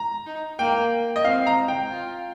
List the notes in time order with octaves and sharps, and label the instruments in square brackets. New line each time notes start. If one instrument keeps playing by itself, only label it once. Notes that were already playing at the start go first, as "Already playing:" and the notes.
Already playing: [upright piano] A#5
[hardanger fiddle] D#4
[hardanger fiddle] A#3 [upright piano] G5
[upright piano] D#5
[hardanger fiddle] C4 [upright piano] F5
[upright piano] A#5
G5
[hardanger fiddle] F4